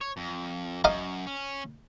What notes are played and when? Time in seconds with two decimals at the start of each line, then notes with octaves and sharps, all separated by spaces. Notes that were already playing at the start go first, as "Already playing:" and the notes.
0.01 C#5
0.17 F2
0.84 F#2 D#5 F5 A#5
1.27 C#4